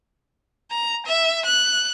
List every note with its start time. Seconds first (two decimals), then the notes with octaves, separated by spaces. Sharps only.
0.71 A#5
1.06 E5
1.46 F#6